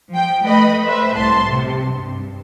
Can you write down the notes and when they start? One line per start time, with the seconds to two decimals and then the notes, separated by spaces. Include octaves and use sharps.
0.13 F3 G5
0.46 A3 B4 D#5 B5
0.85 B4 C5 E5
1.17 C2 A2 A5 C6
1.49 C3
1.90 G2